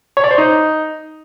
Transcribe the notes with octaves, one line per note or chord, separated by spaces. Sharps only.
C#5
D5
C5
D#4